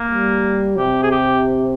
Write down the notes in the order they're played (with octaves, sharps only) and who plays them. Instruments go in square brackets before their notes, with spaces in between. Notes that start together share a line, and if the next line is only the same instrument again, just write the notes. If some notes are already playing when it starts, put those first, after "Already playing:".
Already playing: [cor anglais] A#3
[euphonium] G3
[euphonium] C3 [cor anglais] G4
[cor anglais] G#4
G4